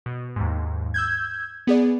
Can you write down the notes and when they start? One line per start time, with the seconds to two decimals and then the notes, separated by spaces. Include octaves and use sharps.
0.06 B2
0.36 D#2 G#2
0.94 E6 G6 G#6
1.67 B3 G#4 D5